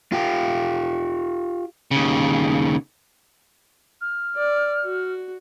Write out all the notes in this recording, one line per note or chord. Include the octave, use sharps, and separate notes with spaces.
F4 G4
D#2 C#3
F6
D5
F#4